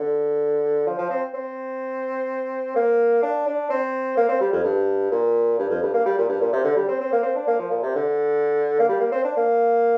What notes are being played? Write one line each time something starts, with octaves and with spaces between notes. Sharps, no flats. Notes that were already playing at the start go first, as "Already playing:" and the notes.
Already playing: D3
F3
F3
C4
C4
A#3
D4
D4
C4
A#3
C4
G3
F2
G2
A#2
G2
F2
G2
A#3
G3
A#2
G2
A#2
C3
D3
G3
C4
C4
A#3
C4
D4
A#3
F3
A#2
C3
D3
A#3
G3
A#3
C4
D4
A#3